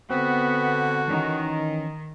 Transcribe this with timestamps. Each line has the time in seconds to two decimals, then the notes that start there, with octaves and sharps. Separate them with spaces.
0.10 D3 B3 C4 F#4
1.08 D#3 E3 C#4